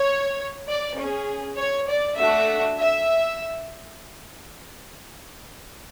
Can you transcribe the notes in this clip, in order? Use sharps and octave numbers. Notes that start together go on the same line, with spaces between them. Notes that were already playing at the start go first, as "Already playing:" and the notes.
Already playing: C#5
D5
C#4 G#4
C#5
D5
A3 D4 F#4 E5
E5